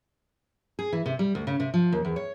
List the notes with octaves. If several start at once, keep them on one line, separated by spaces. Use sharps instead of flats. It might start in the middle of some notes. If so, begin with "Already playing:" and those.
G#4
E3
C3
G3
D2
C#3
C3
F3
D#2
E2
C#5